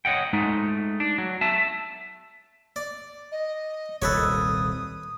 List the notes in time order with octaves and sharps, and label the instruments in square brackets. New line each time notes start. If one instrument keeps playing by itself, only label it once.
[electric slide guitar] C#5 D#5 F#5 G5
G#3 A3 D#4
D4
F#3
E5 A5
[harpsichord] D5
[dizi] D#5
[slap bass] D#1 C2 [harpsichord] A4 B4 C#5 [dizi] D#6